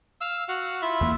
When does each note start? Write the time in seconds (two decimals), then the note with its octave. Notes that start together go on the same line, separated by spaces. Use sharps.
0.21 F5 E6
0.49 F#4 F5 F#5
0.82 E4 F4 E5
1.01 E2 A#3